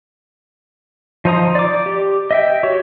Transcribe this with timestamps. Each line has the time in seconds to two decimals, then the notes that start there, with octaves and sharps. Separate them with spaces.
1.25 F3 D#4 C5 A#5 D#6
1.55 D5 D6
1.86 G4
2.31 D#5 E5 G5
2.63 F#4 G4 C#5